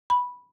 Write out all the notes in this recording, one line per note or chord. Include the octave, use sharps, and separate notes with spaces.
B5